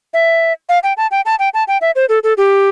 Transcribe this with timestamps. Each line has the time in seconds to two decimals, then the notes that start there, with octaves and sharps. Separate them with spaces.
0.14 E5
0.69 F5
0.83 G5
0.97 A5
1.11 G5
1.26 A5
1.39 G5
1.54 A5
1.68 G5
1.81 E5
1.96 C5
2.09 A4
2.24 A4
2.37 G4